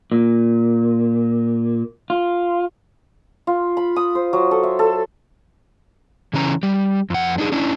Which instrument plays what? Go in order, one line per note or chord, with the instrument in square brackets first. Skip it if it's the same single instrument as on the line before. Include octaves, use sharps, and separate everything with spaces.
[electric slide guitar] A#2
F4
[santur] F4
B5
D#6
C5
F#3
A4
E5
A4
[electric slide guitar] C#3 E3 C#4 A#5
G3 G4
F2 F#5
D4 D#4 G#4
C#4 D4 E4